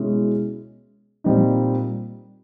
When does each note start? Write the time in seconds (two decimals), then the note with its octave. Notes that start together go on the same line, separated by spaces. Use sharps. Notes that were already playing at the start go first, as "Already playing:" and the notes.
Already playing: B2 G#3 C#4 E4
1.24 A#2 G3 C4 D#4